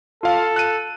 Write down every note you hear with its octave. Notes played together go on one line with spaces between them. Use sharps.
F4 A4 F5
F#6 D#7